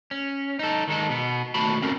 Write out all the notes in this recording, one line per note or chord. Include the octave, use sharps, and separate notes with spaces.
C#4
D#4 A4
D#3 G#3 D#4 A4
B2 B3
D#2 B2 A3 F#4 A5 B5
C4 C#4 A4 A#4